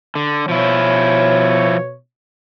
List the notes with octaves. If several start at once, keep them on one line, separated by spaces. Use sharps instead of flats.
D3
B2 F3 E4 C#5